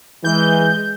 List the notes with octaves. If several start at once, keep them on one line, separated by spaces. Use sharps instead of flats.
E3 G#3 G6